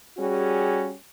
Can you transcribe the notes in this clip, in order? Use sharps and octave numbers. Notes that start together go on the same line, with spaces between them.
G3 C#4 F#4 G#4